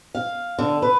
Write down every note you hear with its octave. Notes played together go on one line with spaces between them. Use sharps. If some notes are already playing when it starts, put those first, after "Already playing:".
F5
D3
B4